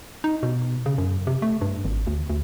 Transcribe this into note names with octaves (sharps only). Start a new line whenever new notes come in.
D#4
B2
C#3
F#2
C3
A3
G2
G#1
D2
D2